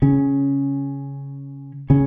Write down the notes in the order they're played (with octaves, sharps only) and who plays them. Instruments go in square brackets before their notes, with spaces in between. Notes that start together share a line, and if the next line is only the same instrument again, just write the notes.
[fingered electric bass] C#3 C#4
C#3 C#4